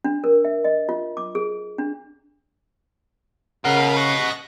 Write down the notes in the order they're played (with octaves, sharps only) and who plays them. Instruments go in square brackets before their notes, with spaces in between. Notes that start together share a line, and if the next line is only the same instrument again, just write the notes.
[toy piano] D4
A#4
E5
D#5
F4
D6
G#4
D4
[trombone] C#3 [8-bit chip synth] A#4 B5 F6 [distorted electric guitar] D#5 F#5
[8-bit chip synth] C#6 F#6 A#6